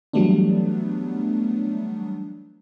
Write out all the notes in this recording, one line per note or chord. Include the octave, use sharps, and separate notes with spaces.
E3 F#3 G3 A3 B3 D4